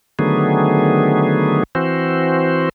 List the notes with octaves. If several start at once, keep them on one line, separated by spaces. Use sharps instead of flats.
D3 D#3 F#3 A3 B3 G#4
E3 C4 F#4 C5